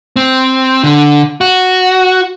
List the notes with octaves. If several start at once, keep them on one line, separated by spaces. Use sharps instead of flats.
C4
D3
F#4